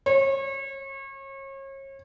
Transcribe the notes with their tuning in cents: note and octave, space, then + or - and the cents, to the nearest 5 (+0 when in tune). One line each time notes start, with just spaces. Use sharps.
C#5 -35